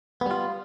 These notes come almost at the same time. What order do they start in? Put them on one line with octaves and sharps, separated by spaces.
B3 G3 F4